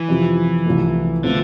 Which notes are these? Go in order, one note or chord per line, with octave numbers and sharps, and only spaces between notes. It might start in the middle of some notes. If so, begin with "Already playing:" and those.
Already playing: E3
F2 C3 F3
C2 C3 F3 A3 E4
B2 D3 A3 C4 F4